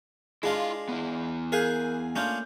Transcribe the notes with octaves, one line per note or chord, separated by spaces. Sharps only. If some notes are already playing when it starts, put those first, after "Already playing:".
G#3 D4 E4 F4 F5
B3 E4
G#4 A#4 F5 G#5 F#6 G6
A3 A#3 C#4 D4 F4 G6